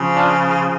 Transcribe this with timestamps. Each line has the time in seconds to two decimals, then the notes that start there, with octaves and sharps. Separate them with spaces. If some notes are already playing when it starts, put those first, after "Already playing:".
Already playing: C#3 F3
0.15 D4 F4